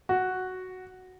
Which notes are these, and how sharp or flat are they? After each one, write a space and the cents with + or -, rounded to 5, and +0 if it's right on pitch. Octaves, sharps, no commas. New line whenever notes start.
F#4 +0